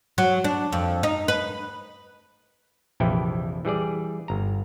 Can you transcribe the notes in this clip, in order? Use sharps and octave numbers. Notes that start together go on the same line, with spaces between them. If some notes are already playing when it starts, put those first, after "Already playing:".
F#3
D4
F2
D#4
B4
A#1 F2 C3 E3 E4 G5
E3 G3 G#4 D5
G1 A#5